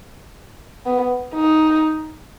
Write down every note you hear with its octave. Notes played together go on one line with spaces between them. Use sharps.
B3
D#4